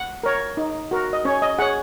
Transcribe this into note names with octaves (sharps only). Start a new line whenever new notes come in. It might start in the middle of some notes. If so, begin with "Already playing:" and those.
Already playing: F#5
A#4 C#5
D#4
F#4 A#4
D#5
C#4 C#5
D#5
G#4 C#5 F#5